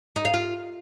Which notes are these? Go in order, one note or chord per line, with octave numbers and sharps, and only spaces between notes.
D#4
F5
F4